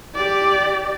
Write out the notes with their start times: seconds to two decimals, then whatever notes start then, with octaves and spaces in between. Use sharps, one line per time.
0.16 G4 D5